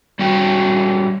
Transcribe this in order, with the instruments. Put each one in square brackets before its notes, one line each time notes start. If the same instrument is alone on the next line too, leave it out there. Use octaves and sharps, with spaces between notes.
[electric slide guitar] G3 C#4 F#4 G5